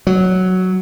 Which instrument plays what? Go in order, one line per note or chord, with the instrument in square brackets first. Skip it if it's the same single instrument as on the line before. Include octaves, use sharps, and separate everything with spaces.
[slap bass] F#3